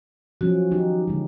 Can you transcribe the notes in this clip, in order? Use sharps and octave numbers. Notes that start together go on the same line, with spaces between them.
F3 F#3 C#4 F#4
D#3 D#4 G4
D3 G#3